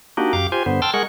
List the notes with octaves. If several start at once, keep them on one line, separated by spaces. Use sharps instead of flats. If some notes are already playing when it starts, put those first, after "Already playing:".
A#3 D4 D#4 F#4 G4
F#2 G4 F5 D6
F4 G4 C5 G#5
G2 D3 B3 C5
G5 A5 C6 E6 F6
G#3 G#4 A#4 F#5 C#6